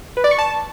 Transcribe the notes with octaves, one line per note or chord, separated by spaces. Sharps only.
B4
D5
C#6
A5